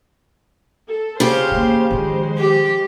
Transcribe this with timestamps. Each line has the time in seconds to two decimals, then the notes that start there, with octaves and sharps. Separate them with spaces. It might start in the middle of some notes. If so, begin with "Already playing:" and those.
0.89 A4
1.20 C#3 G4 C5 F5
1.51 E3 A#3
1.91 D#3 F3 G#3 C5
2.38 G4